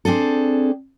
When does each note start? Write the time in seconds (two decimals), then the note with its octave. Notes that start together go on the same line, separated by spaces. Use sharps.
0.05 C4 D4 G#4 A4